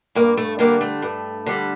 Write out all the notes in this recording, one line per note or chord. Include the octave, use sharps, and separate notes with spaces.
G2 A#3
A3
D3 G3 A#3
A3
G2
D3 G3